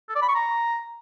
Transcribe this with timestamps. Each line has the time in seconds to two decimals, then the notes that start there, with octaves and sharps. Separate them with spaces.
0.09 A4
0.16 D5
0.22 B5
0.29 C#6
0.35 A#5